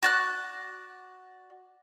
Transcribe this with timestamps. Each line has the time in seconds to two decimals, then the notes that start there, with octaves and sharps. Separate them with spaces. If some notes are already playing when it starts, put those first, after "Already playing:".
0.03 F#4 D5 F#6